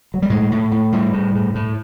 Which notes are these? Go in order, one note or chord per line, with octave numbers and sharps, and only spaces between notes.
F#3
G3
A2 G#3
A2
A2
A2 G3
A2
A2
A2